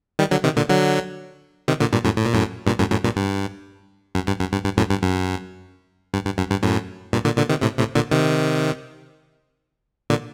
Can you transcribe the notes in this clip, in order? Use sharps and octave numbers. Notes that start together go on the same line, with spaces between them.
D#3 G3
D3 F#3
C3 D#3
A#2 D3
D3 F#3
C3 D#3
A#2 D3
G2 A#2
F#2 A2
A2
A#2
F#2 A2
G2 A#2
F#2 A2
F#2 A2
G2 A#2
G2
F#2
G2
F#2
G2
G2
F#2 A2
G2
F#2
G2
G2
F#2
G2
F#2 A2
G2 A#2
A#2 D3
A#2 D3
C3 D#3
A2 C3
A2 C3
A#2 D3
C3 D#3
A#2 D3